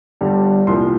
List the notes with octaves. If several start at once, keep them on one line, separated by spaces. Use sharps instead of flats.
G1 G2 D3 G3
C2 A#2 F3 C6